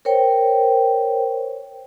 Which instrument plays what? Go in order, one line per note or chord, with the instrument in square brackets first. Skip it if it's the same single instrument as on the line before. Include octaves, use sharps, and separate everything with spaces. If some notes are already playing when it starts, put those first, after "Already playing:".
[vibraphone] A#4 C5 C#5 G5